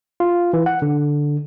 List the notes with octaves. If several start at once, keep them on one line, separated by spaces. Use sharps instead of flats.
F4
E3
F#5
D3